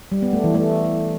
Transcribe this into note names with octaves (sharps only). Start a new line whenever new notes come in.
G3
B3
A3
E3
A3